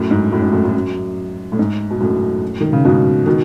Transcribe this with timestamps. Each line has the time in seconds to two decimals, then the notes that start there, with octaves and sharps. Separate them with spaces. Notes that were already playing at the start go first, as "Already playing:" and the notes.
Already playing: F#2 A2
0.11 G#2
0.32 F#2 A2
0.42 G#2
0.53 F#2 A2
0.64 F#2 A2
0.74 F#2
1.52 A2
1.59 G#2
1.90 B2
2.00 F#2 A2
2.60 D#3
2.73 C#3
2.85 G#2 B2
3.26 B2 D#3